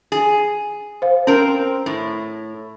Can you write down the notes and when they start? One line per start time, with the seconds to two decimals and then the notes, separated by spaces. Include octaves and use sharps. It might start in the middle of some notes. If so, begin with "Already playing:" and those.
0.12 G#4
1.02 C5 F5
1.27 C4 C#4 A#4
1.86 A2